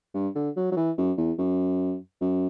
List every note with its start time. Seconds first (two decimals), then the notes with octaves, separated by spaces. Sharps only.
0.14 G2
0.35 D3
0.56 F#3
0.72 F#3
0.77 E3
0.98 F#2
1.18 E2
1.38 F#2
2.21 F#2